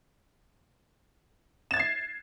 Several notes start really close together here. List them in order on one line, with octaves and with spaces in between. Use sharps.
E7 A6 G#6 C7